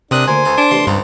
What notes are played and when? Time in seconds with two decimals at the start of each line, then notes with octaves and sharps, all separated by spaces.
0.11 C3 C4 D4 A#4 G#5 D#6 F#6
0.28 D2 A#3 C5 G#5
0.45 C#2 A4
0.57 D4
0.71 A1 C3 C6
0.87 C#2 G2 C4